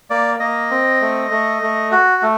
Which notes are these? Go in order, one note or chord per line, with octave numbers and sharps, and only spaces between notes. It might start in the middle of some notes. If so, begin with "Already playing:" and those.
A#3 D5
A#3 D#5
C4
A3
A3
A3
F#4
A3